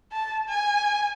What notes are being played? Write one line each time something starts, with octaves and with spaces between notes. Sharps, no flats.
A5
G#5